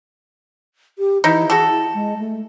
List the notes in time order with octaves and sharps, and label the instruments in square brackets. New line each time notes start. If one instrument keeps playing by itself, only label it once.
[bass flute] G4
[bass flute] E3 [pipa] D#4 E4
[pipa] F#4 A4 [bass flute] G#4
[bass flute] E4
G#3
A3